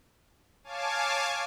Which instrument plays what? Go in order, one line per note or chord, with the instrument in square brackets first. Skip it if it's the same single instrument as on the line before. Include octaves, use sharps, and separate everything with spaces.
[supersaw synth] C#5 F5 G#5 A5 D6